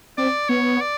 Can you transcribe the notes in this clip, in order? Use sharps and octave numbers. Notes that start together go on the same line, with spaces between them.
C4 D5
B3 C#5
D5